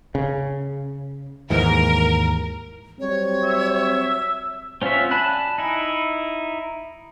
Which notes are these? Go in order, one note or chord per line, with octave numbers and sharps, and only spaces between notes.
C#3
D#2 G#2 E3 A#4
F#3 G3 C4 C#5
E5
C4 C#4 F4 F#4 E5
D5 G#5 A5 B5 F#6
D#4 E4